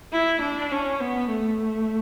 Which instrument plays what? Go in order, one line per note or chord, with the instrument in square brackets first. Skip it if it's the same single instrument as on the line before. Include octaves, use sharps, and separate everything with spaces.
[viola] E4
D4
C#4
B3
A3